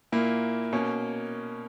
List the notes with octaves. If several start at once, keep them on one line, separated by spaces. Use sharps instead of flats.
A#2 A#3 E4
B2 A#3 C#4